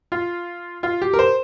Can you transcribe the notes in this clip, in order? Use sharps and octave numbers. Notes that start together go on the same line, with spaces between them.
F4
F4
G4
A#4
C5